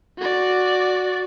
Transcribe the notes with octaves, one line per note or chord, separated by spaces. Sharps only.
F#4 D5